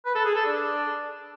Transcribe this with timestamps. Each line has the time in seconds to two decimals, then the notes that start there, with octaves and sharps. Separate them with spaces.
0.05 B4
0.15 A4
0.25 G#4
0.35 A4
0.45 D4